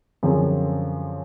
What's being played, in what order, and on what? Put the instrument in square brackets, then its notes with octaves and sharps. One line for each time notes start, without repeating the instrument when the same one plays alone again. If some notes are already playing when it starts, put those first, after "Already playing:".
[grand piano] F#2 D3 F3 G#3 C4